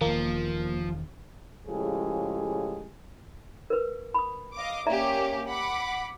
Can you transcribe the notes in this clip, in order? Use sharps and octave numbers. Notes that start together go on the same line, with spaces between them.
E1 D#3 F3 A#3
A2 C#3 F3 G#3 G4 G#4
A#4 B4
B5 D#6
D#5 F5 D6
A#3 C#4 G4 D5 E5 A#5
F#5 B5 D6